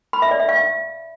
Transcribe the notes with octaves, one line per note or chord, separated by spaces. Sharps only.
B5
E5
D5
E5
F5